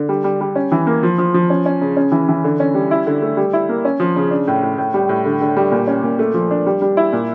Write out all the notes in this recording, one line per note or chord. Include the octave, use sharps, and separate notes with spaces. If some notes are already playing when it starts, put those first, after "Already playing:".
Already playing: D3
G3
G3
G3
C#4
E3
A#3
F3
F3
F3
C#4
C#4
C#3
C#4
E3
E3
D3
C#4
G3
E4
D3
A3
G3
E4
A#3
C#4
F3
C#3
D4
A2
A2
A2
G3
A2
D3
D3
G3
A#2
C#4
A#2
A3
F3
D4
G3
G3
E4
A#2